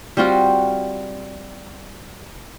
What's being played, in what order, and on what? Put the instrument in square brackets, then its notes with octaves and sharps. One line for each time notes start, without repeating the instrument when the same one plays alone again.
[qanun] G3 C4 F4 F#4